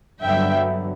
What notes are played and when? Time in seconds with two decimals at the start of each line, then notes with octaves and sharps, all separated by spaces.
0.21 G2 D3 F#3 B3 E5 G5